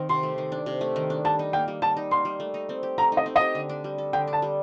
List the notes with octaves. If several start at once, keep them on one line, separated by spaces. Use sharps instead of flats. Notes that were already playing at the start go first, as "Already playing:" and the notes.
Already playing: D#3 C4
C3 C6
A3
D#3
D4
C3
A3
D#3
D4
G3 A5
D#4
A#3 G5
G3
G3 A5
D#4
A#3 C6
G3
A3
D#4
C4
G4
A3 A#5
D#4
D#5
C4
D#5
G4
D3
D4
G3
A4
D3 G5
D4
A5
G3